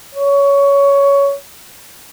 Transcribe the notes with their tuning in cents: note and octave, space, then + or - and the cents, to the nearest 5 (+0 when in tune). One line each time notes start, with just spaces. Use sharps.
C#5 +15